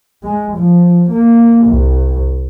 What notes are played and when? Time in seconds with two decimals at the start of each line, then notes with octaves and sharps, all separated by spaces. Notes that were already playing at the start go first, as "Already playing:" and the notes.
0.23 G#3
0.57 F3
1.10 A#3
1.66 C2